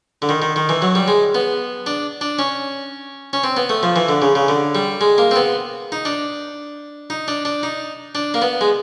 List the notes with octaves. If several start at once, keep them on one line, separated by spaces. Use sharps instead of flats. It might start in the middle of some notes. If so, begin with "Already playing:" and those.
D3
D#3
D#3
D#3
E3
F#3
G3
G#3
B3
D4
D4
C#4
C#4
C4
B3
A3
F3
E3
D3
C#3
C#3
D3
G3
G#3
A#3
C4
B3
D#4
D4
D#4
D4
D4
D#4
D4
A#3
B3
G#3